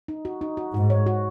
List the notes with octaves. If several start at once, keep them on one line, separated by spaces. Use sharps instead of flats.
D#4
F#4
D#4
F#4
G#2 F#4
C#5
F#4